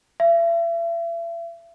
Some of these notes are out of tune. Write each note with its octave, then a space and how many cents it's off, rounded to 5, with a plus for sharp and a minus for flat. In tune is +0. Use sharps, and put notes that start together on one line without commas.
E5 +40